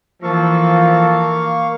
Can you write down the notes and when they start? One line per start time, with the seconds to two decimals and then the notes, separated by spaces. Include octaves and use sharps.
0.23 E3 F3 A#3 A4 F5 C#6